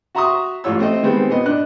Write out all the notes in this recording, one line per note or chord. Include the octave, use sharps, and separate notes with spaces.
F#4 E5 A#5 C6 C#6 D#6
A1 F4 C#5 E6
A3 C4 C5 D#5
D#3 G3 G#3 B3 C4
A#2 B3 D#5
D4 D#5 F#6